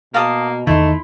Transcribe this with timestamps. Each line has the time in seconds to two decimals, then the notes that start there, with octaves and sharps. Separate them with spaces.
0.14 B2 A#3 F5 A5 D#6
0.67 E2 D#3 A3 D#4 E4 C6